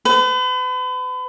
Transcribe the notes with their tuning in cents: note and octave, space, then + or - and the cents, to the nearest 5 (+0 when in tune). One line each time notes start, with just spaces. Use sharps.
B4 +40